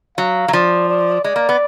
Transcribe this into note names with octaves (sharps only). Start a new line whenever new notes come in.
F#3 F5
F#3
F3 D5
D5
G#3 D5
A#3
B3